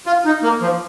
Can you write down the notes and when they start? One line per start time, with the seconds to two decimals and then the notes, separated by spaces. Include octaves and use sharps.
0.06 F4
0.25 D#4
0.43 A#3
0.61 F3